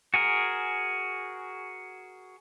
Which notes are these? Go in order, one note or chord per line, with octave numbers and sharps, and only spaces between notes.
F#4 G#4 A#4